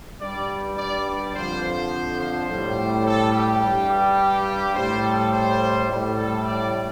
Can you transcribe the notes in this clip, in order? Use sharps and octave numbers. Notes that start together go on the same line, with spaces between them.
G2 G3 D5
D5
D5
F2 D3 F3 C5
C5
C5
A2 G3
A4
G4
G2 G3
G4
A2 G3 C5
A4
C5
A2 G3
A4
D5